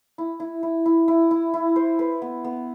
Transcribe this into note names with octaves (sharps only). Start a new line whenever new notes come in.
E4
E4
E4
E4
E4
E4
E4
C5
B4
B3
B3